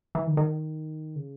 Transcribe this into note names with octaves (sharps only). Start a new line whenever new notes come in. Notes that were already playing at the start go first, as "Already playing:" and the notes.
E3
D#3
D#3
C#3